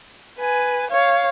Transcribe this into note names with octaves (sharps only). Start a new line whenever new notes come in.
B4 G#5
C#5 F5